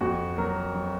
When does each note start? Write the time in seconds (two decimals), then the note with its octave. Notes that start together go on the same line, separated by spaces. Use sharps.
0.01 F2 F#4
0.38 F#3 A#4
0.75 F#3